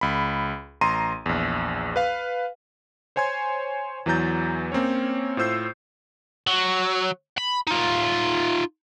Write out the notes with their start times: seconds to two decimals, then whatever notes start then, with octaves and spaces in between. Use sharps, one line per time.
0.01 C#2 B5
0.81 A1 A#5 C6 D#7
1.26 A#1 E2
1.96 B4 F5
3.16 C5 C#5 G#5 C6 G#6
4.06 E2 E3 F#3 A#5 G6 A6
4.72 A#3 C4 C#4 C#5
5.37 A2 F4 C5 E6 G6 C7
6.47 F#3
7.38 B5
7.67 D#4 F4